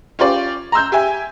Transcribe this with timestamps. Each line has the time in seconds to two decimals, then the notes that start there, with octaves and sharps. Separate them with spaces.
0.19 C#4 F4 G4 D5
0.72 A#5 C6 E6 G6
0.92 G4 E5 G#5